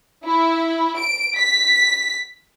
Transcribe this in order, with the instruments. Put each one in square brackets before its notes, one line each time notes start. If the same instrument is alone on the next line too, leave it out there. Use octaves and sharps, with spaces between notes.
[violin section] E4
D7
B6